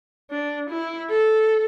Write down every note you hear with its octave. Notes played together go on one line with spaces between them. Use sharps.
D4
E4
A4